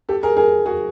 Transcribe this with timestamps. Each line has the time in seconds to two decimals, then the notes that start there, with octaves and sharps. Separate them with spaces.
0.09 G4 A4
0.23 G#4 A#4
0.37 G#4 A#4
0.66 F#4 G#4